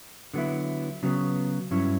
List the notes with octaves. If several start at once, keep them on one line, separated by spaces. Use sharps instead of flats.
D3 F#3 B3 E4
C#3 F#3 B3
G2 F#3 C#4 E4